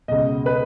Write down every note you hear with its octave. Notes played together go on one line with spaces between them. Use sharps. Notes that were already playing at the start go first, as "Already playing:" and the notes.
C#2 B2 D#5
B4